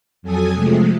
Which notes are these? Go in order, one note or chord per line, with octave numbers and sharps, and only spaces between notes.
F2 F#3 A4 G#5 D#6 G#6
C3 F3 G#3 A3